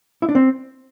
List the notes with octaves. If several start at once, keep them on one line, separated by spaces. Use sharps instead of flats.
E4
D4
C4